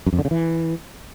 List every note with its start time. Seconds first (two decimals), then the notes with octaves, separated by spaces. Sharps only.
0.06 F#2
0.13 F2
0.19 D3
0.25 C#3
0.31 E3